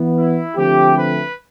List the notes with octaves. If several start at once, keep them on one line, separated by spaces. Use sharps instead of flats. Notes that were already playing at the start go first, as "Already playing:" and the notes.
Already playing: E3 B3
E4
D3 F3 A3 C4 G4
B4